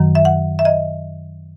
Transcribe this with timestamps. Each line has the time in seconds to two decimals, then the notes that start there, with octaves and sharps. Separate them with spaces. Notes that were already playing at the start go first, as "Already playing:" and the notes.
Already playing: F#2 D#3 F#3
0.15 E5
0.25 F#5
0.59 E5
0.65 D#5